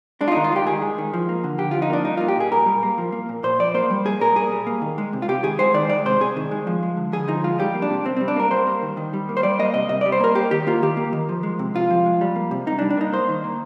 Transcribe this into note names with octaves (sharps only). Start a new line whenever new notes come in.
G#3 D4
F4
D#3 D#4
F4
G#3 G4
D#3 G#4
G#3
D#3
F3
A#3
D3
D3 G4
F3 F4
D#4
A#3 D4
G3 D#4
A#3 F4
G4
A#2 G#4
A#2 A#4
G3
A#3
F3
A#3
A#2
A#2 C5
F3 D5
A#3 C5
G3
A#3 G#4
A#2 A#4
A#2 G#4
G3
A#3
D#3
G#3
C3
F4
C3 G4
D#3 G#4
G#3 C5
D#3 D5
G#3 D5
C3 C5
C3 G#4
D#3
G#3
F3
G#3
D3
D3 G#4
F3 D#4
G#3 F4
G3 G4
A#3
D4
C3
C3 C4
G3 C4
D4
A#3 A#4
G3 C5
A#3
D#3
D#3
G3
A#3
C5
G3 D5
A#3 D#5
C3 D#5
C3 D#5
G3 D5
C5
A#3 A#4
A#3 G4
D#3 G4
A#3 F4
D#3 G4
A#3
D#3
F3
G#3
C3
C3 F4
F3
G#3
G3
A#3
C3
C3 D#4
D4
G3
D4
A#3 D#4
A#3 C5
D#3
A#3